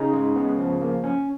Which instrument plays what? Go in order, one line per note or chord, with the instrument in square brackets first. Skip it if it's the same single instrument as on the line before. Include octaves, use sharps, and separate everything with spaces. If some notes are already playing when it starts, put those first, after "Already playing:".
Already playing: [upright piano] C#3 [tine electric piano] D#4
[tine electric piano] G#3
B3
F3
A#3
C#4